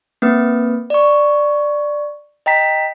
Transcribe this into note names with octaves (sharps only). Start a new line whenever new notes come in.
A#3 C4 B4
D5 C#6
D#5 G5 A#5 B6